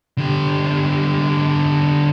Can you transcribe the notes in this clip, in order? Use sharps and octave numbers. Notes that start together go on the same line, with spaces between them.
D3 G4